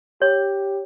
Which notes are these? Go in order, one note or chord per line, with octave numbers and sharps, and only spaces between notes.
G4 C#5